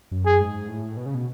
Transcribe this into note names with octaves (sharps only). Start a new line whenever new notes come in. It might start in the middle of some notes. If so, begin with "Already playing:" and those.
F#2
G#4
G#2
A2
B2
C#3
B2